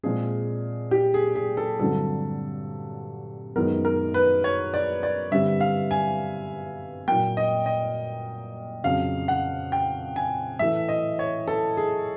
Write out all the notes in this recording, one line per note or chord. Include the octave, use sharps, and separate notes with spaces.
A#2 F3 G#3 C4 G#4
G4
G#4
G#4
A4
G2 D3 F#3 A3 C4 A4
F#2 D#3 G#3 B3 A#4
A#4
B4
C#5
D5
D5
G2 D3 G3 C4 E5
F5
G#5
A#2 F#3 A#3 G5
D#5
D#5
F2 C#3 F#3 F5
F#5
G5
G#5
A2 E3 A3 E5
D#5
C#5
A4
G#4